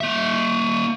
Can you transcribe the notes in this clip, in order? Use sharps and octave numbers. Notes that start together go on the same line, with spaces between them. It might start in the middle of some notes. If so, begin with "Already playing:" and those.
A#3 E5